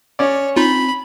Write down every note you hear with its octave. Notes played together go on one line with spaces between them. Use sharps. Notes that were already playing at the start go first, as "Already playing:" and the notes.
C#4 C#5 D5
C4 D#4 F4 B5